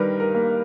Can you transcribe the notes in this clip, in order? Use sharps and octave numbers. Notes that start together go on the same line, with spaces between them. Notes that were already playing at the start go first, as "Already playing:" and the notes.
Already playing: G2 D#3 G3 A#4 B4
A#4
A#3